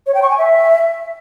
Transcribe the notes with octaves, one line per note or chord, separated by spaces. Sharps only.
C#5
G5
C#6
G#5
E5